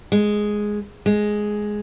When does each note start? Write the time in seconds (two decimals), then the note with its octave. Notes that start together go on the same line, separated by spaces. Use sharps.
0.12 G#3
1.06 G#3